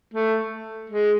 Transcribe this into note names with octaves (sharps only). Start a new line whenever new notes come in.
A3
G#3